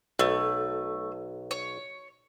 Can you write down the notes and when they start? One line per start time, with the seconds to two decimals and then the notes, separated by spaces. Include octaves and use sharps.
0.19 B1 A3
1.51 C#5